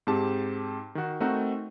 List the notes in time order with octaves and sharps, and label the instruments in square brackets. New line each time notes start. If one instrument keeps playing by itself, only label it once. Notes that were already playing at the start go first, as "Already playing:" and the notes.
[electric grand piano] G#2 C4 G4 A5
D#3 F#4
A3 C4 D#4 F#4 A#4